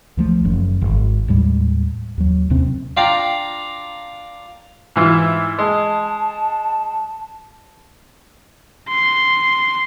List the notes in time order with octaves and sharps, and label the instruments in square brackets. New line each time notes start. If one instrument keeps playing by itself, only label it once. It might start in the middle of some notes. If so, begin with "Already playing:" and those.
[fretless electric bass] C#2 F3 A3
F#1 F#2 D#3
G#1
D#2 A2 G3 G#3
D#2 F#3
D#2 C3 C4 C#4
[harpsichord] D4 F4 F5 G5 A#5
[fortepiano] G#2 E3 F4
[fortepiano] G#3 [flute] A5
[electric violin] C6